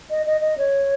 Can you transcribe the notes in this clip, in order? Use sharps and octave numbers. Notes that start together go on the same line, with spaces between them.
D#5
D#5
D#5
C#5